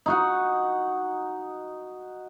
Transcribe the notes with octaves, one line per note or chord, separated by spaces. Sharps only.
D#4 F#4 F#5